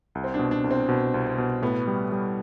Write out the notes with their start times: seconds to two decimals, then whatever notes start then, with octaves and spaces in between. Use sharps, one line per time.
0.15 C2
0.24 C4
0.34 D4
0.39 B2
0.51 D4
0.64 C2
0.71 C4
0.89 B2
1.14 C2
1.38 B2
1.62 A2 B3
1.87 G3
2.12 G3